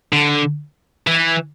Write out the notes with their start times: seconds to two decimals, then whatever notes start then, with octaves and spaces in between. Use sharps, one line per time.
0.13 D3
1.07 E3